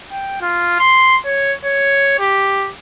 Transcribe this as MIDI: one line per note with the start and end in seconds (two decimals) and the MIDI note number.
0.12 0.40 79
0.42 0.79 65
0.80 1.16 84
1.25 1.54 73
1.65 2.19 73
2.19 2.70 67